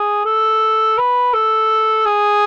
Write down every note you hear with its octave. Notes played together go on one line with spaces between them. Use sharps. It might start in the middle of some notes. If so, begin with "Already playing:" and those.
Already playing: G#4
A4
B4
A4
G#4